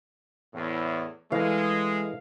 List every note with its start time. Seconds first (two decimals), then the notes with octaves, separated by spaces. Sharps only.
0.54 E2 A2
1.32 E3 G#3 A3 F5